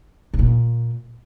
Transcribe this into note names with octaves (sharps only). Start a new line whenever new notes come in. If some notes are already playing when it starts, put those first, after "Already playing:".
C3
A#2